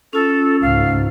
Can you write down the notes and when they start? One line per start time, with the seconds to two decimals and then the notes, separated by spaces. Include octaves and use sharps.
0.13 C#4 F4 A4
0.62 C#2 G#2 F5